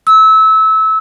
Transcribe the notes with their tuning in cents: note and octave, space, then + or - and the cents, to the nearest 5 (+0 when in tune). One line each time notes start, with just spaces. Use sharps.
E6 -25